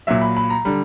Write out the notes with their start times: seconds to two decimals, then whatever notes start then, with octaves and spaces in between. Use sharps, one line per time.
0.07 A#2 F#3 E5
0.21 B5
0.37 B5
0.50 A#5
0.65 D3 G3